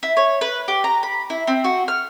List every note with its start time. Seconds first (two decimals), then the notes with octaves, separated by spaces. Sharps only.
0.03 E4
0.17 C#5
0.41 B4
0.68 G4
0.84 A#5
1.03 B5
1.30 E4
1.47 C4
1.64 F#4
1.88 F6